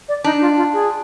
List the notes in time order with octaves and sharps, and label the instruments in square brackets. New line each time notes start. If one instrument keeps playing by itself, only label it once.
[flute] D5
[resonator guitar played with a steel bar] D4 [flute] D#4
[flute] F4
F4
G#4